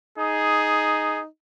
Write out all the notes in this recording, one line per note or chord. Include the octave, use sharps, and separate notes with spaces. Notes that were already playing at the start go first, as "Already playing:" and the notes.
D#4 G#4